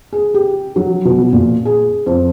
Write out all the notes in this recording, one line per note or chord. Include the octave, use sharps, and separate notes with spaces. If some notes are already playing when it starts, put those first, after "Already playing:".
G#4
G4
F#3
B2
A#2
G#4
F2